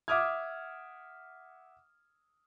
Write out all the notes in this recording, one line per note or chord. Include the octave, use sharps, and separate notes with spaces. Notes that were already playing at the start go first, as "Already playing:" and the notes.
E5 F#5 D6 D#6 F6 G#6